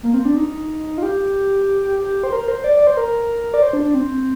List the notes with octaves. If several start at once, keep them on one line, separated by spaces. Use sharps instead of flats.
A#3
C4
D4
D#4
F4
G4
G4
C5
A#4
C5
C5
D5
D5
C5
A#4
D5
C5
D4
D4
C4